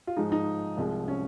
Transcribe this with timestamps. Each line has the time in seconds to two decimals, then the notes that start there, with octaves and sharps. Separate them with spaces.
0.07 F4
0.16 G#2 F3 G#3 D#4
0.32 D#4
0.77 C2 C3 F3 G#3
1.08 C#4